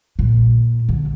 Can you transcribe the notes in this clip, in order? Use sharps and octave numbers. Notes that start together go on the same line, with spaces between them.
A#2
D3